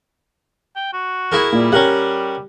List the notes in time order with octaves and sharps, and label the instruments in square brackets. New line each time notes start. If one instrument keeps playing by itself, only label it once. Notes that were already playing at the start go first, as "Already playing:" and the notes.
[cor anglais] G5
F#4
[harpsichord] E4 G#4 A#4
[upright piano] A#2 [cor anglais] G3
[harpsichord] C#4 A#4 F#5 [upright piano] G4